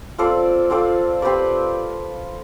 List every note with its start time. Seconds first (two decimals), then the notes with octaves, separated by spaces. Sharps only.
0.18 C4 F4 A4 D5
0.70 C4 F4 A4 D5
1.22 C4 G4 B4 D5